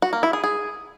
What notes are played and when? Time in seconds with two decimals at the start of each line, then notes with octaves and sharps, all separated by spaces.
0.02 F#4
0.13 A#3
0.23 E4
0.33 G#4
0.44 G#4